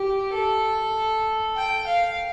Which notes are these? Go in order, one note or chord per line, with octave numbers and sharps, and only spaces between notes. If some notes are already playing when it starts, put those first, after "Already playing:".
Already playing: G4
A4
G5
F5